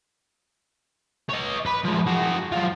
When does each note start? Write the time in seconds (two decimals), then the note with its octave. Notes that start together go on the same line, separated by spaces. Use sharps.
1.29 C#5 D#5
1.66 B4 B5
1.84 F3 G#3
2.06 F#4 G#4
2.52 F#3 F4